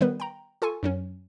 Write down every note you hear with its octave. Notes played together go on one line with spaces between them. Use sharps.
D#3 G3 B3 B4
G5 A#5
F4 A4 G#5 C#6
F#2 F#3 C#4